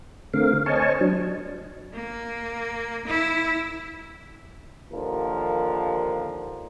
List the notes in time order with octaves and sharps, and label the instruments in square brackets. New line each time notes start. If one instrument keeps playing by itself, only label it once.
[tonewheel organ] D3 A3 C4 A#4 F5
C5 C#5 D#5 G#5 A5 C#6
F#3 D4
[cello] A#3
E4
[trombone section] D#2 D3 F3 A#4